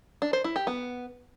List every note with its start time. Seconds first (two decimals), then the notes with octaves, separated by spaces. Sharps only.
0.22 D4
0.33 C5
0.44 E4
0.56 G4
0.67 B3